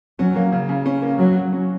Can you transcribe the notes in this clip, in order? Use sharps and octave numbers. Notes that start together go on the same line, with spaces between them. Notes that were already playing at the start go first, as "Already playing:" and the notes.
F#3 C#4
A#3
C#3
C#3
C#4
A#3
F#3 F#4
F#3
C#4